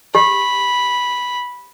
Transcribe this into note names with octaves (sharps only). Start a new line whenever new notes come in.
G4 B5